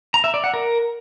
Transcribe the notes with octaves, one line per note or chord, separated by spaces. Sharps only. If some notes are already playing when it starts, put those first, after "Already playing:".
A#5
E5
D5
F#5
A#4